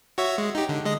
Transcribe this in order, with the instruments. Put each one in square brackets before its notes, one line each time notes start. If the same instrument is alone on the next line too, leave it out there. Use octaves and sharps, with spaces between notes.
[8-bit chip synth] F#4 C#5 E5
G#3
D#4 G4
D3
G#3 D#5